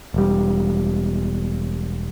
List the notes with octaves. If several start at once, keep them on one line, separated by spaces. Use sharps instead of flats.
E1 G3